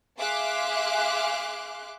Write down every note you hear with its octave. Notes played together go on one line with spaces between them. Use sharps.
G#4 E5 F5 C6 D6 F#6